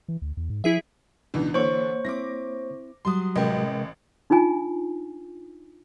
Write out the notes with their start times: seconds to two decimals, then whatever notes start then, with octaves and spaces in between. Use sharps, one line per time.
0.08 E3
0.22 D2
0.37 E2
0.50 G#2
0.64 F3 E4 G#4 E5
1.34 C#2 B2 E3 D4 D#4
1.54 D3 E3 A#3 C5 C#5 C#6
2.05 C4 E4 D6 A#6
3.05 F#3 G3 C6 D#6
3.36 A1 C3 G#3 A#4 D#5 G5
4.30 D4 D#4 F4 G#5 A#5